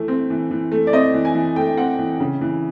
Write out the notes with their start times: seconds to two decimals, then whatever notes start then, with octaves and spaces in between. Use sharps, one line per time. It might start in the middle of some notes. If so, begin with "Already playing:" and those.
Already playing: E3 A3
0.08 C4
0.30 E3
0.51 E3
0.72 A3
0.87 D5
0.93 C4 D#5
1.14 E3
1.25 G#5
1.35 E3
1.56 A3 G5
1.77 C4 F#5
1.99 E3
2.20 C#3
2.41 E3